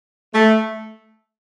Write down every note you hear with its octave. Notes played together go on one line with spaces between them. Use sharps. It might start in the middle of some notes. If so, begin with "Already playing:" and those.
A3